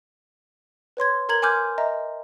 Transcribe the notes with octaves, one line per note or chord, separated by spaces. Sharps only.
B4 C#5 C6 G#6
A#4 A#5 G#6 F#7
G#5 C6 D6 F6 G6 G#6
D#5 E5 A#5